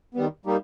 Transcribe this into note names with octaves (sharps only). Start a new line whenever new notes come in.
D#3 G3 B3
G3 A#3 D#4 G4